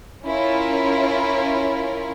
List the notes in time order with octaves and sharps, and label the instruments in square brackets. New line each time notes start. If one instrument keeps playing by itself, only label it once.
[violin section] C#4 E4 F4 A#4